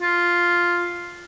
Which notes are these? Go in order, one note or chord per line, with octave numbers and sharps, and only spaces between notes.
F4